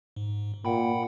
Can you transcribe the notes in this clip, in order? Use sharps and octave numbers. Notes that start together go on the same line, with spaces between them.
G#2
A#2 F#5 G5 B5